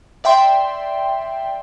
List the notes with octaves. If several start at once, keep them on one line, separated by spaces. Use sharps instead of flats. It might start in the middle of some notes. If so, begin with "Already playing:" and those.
D5 E5 G5 C6